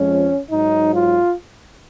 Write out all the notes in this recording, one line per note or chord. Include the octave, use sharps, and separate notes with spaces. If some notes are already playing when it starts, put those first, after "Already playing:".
Already playing: F2 F3 G#3 C#4
G#2 F#3 D#4
F4